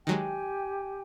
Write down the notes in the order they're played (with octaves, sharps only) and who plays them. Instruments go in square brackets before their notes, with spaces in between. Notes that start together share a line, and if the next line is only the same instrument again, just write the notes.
[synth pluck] D#3 F#3 G#3 [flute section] G4 G5 G#5